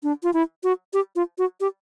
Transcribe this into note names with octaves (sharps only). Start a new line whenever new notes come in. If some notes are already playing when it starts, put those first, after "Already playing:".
D4
F4
E4
F#4
G4
F4
F#4
G4